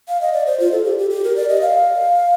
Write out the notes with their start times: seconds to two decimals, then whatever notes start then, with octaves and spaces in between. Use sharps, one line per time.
0.08 F5
0.21 D#5
0.33 D5
0.46 C5
0.60 F4
0.72 A4
0.85 G4
0.98 G4
1.10 G4
1.24 A#4
1.36 D5
1.49 D#5
1.62 F5